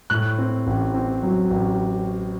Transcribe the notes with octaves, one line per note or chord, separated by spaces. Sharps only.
A2 F#6
C4
A1
C4
F#3
A1